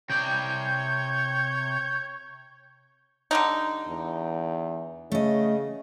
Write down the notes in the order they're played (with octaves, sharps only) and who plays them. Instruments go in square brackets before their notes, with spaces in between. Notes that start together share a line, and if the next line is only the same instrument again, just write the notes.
[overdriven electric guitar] C3 D5 [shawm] C#5 [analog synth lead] G6
[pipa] D3 G3 D#4
[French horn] E2
[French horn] C#3 [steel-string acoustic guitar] A3 D#5